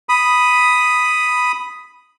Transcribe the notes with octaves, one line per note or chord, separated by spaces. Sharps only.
B5 D#6